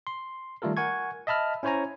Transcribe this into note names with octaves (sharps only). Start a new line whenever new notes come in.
C6
D#3 G3 A3 F4 A4 A#4
A#4 F#5 G#5 C#6 G#6
D#5 E5 A5 B5 F6
C#4 E4 C5 C#5 G#5 A#5